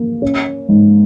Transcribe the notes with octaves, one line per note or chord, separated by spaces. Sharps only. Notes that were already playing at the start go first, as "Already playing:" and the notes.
Already playing: A#3
C#4
G#2